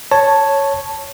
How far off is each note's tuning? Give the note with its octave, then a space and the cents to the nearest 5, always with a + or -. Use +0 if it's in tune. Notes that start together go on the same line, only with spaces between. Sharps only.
C#5 +0 A5 +0